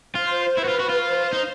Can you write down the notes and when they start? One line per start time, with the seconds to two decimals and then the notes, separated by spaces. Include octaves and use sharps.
0.15 F4 C5
0.57 E4 B4
0.64 F#4
0.68 F4
0.79 F#4
0.89 F4
1.00 C5
1.33 D#4